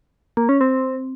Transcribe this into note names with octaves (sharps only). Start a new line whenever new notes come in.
A#3
C#4
C4